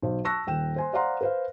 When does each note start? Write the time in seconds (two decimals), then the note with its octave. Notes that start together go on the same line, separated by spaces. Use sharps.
0.02 B1 C5
0.25 A5 C#6 E6 F#6 A#6
0.47 D#1 G5 E7
0.76 C5 G#5 C6
0.93 C5 D5 F5 F#5 A#5 C6
1.21 B4 C5 F5